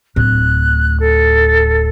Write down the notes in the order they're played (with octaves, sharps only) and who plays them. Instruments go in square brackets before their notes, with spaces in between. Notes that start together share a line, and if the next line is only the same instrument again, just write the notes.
[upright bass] D1 A2 [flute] F#6
[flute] A4